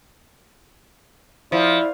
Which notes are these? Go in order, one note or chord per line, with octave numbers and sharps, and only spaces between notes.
F3 E4 D5